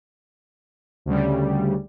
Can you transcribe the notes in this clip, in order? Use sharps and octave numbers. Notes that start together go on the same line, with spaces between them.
D2 C#3 G3